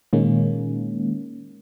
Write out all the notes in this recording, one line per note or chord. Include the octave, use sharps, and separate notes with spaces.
A#2 D#3 G#3 A#3 C#4